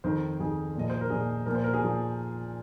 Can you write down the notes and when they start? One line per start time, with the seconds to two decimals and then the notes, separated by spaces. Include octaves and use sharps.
0.04 F2 D#3 C5
0.40 F2 D#3 G#4
0.76 A#2 F3 D#5
0.90 C5
1.01 A#4
1.10 A#2 F3 G#4
1.46 A#2 F3 A#4
1.55 C5
1.64 A#4
1.74 G#4
1.82 A#2 F3 F4